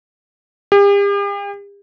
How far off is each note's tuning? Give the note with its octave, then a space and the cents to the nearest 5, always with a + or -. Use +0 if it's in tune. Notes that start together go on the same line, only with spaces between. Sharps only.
G4 +45